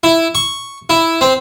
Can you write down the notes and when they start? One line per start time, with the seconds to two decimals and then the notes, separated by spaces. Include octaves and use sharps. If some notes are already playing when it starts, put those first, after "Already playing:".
0.03 E4
0.35 C#6
0.90 E4
1.21 C4